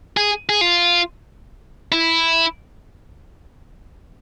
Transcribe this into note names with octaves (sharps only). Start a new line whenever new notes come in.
G#4
G#4
F4
E4